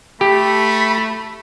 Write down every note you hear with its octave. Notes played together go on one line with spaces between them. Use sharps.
A3 G4 B5